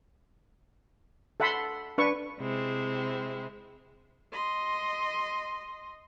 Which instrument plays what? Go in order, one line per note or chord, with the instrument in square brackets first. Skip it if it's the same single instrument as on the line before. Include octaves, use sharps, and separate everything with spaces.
[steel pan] A4 E5 F#5 A5 B5 C6
D4 B4 C#6
[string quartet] C3 G#3 C4 E4
[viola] D#5 C6